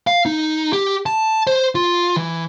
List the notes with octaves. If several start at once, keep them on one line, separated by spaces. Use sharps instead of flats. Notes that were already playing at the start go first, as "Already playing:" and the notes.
F5
D#4
G4
A5
C5
F4
E3